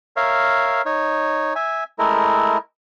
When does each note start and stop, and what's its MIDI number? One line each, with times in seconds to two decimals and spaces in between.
0.16 0.82 70
0.16 0.82 73
0.16 0.82 76
0.16 0.82 77
0.86 1.54 63
0.86 1.54 73
1.55 1.84 76
1.55 1.84 80
1.99 2.58 56
1.99 2.58 57
1.99 2.58 64
1.99 2.58 70